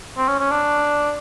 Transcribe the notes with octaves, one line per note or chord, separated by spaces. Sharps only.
C4
C#4
C#4
D4